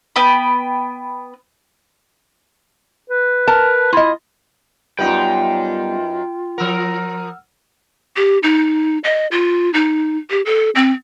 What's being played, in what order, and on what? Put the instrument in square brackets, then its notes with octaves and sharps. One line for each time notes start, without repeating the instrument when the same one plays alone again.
[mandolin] B3 G5 B5
[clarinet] B4
[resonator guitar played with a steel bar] A#4 A5
[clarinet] E4 [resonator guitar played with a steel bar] F4 D#5
[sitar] F#2 D#4 B4 [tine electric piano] G3 B3 [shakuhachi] F4 [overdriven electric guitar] G5
[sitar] F3 A#4 [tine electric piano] F#5 E6 F6
[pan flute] G4
D#4
D#5
F4
D#4
G4
A4
C4